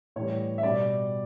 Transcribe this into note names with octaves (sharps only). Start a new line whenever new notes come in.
A2 E3 G3 C#5
E5
B2 G3 D5